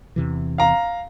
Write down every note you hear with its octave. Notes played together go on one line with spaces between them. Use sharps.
E2 C3 E3
F5 A#5